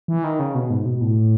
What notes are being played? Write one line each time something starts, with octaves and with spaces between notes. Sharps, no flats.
E3
D#3
C#3
B2
G#2
B2
A2